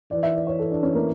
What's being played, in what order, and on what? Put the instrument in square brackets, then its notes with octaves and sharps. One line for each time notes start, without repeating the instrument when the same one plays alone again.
[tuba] E3 [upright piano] D5
[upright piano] E5
D5
C#5
A4
D4
C#4
A#3